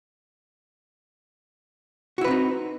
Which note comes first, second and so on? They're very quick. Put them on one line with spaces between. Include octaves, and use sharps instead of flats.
F#4 E4 B4 C4 D#4